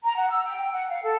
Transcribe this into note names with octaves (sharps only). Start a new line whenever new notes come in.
A#5
F#5
E6
G5
G5
F#5
F5
A4